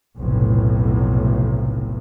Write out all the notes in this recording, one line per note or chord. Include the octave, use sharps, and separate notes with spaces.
F1 B1 A2